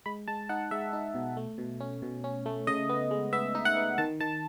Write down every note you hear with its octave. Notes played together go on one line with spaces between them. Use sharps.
G#3 B5
G#3 A5
D#4 F#5
G#3 E5
D#4
B2
A3
B2
C#4
B2
C#4
A3
C#3 D#5
B3
G#3
B3 E5
D#4
F#5
B3
D#3 A5
D#3 A5